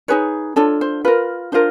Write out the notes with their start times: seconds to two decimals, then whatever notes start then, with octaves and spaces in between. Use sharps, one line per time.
0.08 D#4 G#4 B4 C#5
0.56 D4 F4 A4 C#5
0.81 C5
1.05 F4 A#4 B4
1.52 D4 F4 A#4 C5